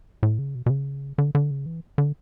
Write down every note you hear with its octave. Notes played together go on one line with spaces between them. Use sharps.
A2
C#3
B2
B2
C#3
D3
D3
C#3
E3
D3